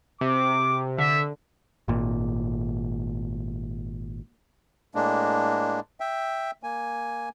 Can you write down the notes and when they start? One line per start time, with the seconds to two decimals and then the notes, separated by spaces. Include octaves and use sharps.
0.21 C3 D6
0.98 D3 E5
1.88 G#1 A#2
4.95 A2 G#3 A#3 D4
6.00 E5 G5
6.63 A#3 G#5